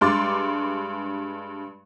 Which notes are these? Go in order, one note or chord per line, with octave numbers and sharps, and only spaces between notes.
G2 G#3 C6 D6 A6